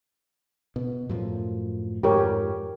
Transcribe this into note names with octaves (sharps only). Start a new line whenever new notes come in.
B2
F#2 A2 F3
F2 G#2 D#3 G4 A#4 C#5